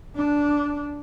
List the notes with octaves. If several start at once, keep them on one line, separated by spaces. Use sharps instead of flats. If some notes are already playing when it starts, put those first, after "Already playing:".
D4